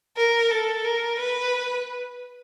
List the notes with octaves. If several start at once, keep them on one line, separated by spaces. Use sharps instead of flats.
A#4
A4
A#4
B4